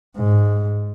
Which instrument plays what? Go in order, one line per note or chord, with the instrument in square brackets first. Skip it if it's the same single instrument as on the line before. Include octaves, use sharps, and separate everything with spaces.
[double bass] G#2